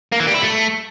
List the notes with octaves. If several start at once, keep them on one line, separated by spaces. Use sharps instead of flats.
A#3
E3
G3
E4
A3